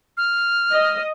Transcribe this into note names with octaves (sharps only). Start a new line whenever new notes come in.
F6
D#5